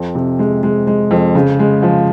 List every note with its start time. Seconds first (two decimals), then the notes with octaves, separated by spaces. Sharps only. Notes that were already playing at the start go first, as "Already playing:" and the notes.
Already playing: F2
0.15 C3
0.39 G#3
0.63 G#3
0.87 G#3
1.11 F2
1.35 C#3
1.59 G#3
1.83 F3